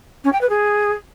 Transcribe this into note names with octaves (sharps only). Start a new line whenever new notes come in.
C#4
G5
B4
G#4